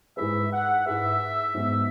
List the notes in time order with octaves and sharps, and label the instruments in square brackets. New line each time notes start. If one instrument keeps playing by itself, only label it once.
[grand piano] G#2 G#3 E4 G#4 B4 [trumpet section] E5
[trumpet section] F#5
[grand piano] G#2 G#3 E4 G#4 B4 [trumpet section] E5
[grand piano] G#2 F#3 B3 G#4